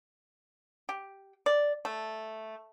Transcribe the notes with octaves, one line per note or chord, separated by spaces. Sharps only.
G4
D5
A3